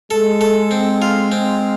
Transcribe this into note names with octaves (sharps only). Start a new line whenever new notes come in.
G#3 A4
A4
C4
F4
C4